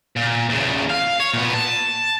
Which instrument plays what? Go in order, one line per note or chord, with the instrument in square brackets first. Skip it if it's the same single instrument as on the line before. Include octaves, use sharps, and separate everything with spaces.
[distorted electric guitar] A#2
E2 C#3
F5
C#5
A#2 B3
A5